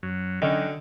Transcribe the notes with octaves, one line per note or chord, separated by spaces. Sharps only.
F#2 F#3
D3 F#3 C#4 D#4 D#5 G5